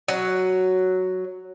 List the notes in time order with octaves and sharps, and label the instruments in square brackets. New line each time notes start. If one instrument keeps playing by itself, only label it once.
[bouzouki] F#3